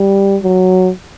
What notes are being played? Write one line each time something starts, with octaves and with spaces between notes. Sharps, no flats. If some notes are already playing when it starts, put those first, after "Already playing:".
Already playing: G3
F#3